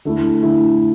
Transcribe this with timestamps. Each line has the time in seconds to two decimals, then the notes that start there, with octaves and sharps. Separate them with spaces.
0.05 D3 A3 E4
0.43 D3 A3 E4